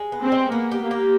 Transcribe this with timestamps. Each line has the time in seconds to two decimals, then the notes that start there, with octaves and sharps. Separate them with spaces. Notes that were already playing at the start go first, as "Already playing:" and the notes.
Already playing: G#3
0.12 B3
0.22 C4
0.32 G#3
0.52 A#3 B3
0.72 G4
0.82 A#3
0.91 G4